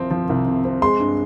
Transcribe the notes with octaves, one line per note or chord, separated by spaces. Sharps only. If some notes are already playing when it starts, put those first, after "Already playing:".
Already playing: C2 C3 F3 C4
F3
C2
C3
C4
G#3 C6
G2